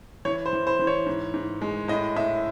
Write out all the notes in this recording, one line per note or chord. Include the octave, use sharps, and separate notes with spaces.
E3 C#5
C5
E3
C5
E3
C#5
G#2
G#2
G#3
A2 D#5
A2 E5